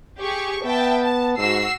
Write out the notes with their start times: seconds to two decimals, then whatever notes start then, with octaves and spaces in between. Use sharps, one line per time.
0.19 G4 G#4 C#6
0.65 B3 E5 G5 A5
1.02 A5
1.38 G#2 F#4 E6 C7